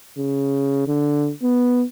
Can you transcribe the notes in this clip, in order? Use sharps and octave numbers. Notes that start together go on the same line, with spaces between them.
C#3
D3
B3